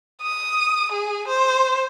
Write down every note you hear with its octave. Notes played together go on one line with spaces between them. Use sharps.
D#6
G#4
C5